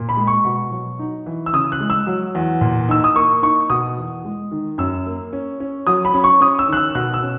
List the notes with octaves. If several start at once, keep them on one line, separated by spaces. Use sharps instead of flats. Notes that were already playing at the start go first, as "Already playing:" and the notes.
Already playing: A#2
B5
G#3
C#6
B2
F#3
D#4
E3
E6
C#3 D#6
F#6
G#3
E6
F#3
E2
A#2
D#4 E6
D#6
A#3 C#6
D#4 C#6
B2 D#6
E2
G#3
D#3
F#2 E6
A#3
C#4
C#4
F#3 D#6
B5
C#4
C#6
C#4 D#6
E6
D#3 F#6
E6
B2 F#6
E6
C#4